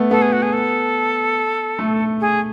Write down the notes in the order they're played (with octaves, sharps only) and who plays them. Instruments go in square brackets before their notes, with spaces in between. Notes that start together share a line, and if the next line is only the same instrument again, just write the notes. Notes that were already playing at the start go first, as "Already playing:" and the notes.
Already playing: [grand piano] A3 B3
[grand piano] B3 [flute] A4
[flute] G#4
F#4
G#4
A4
[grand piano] A3
[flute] G#4